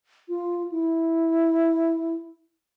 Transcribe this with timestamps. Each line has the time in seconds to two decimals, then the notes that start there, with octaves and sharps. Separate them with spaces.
0.29 F4
0.72 E4